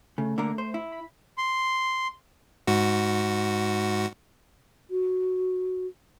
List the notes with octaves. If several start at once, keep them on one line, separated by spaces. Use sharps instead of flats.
C#3 A3
D3 A#3 A#4
C5
E4
B5
C6
G#2 F#4
F#4